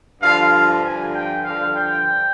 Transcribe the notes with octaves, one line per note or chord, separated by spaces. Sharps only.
G2 D3 F3 F5
G2 D3 F3 G#5
G5
G2 D3 F3 F5
G5